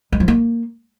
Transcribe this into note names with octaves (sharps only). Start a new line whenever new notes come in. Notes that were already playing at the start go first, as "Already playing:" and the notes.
G#3
F3
A#3